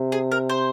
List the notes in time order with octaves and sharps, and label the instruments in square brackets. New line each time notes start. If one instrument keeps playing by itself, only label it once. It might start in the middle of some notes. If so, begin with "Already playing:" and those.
Already playing: [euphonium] C3
[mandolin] G#4
A#4
C5